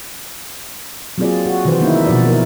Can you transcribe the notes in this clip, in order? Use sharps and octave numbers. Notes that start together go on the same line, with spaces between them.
F#3 A#3 C4 F4 G#4 D5
F#4
C3 D#3 E3 F#4 B4 C5
D#3 A#3 B3 D#4 E4
B2 F3 F#4 D5
A#3 D#4 E4 A#4